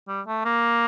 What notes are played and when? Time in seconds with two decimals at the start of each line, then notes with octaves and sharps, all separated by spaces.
0.08 G3
0.27 A3
0.45 A#3